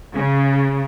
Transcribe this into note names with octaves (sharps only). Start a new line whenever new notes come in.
C#3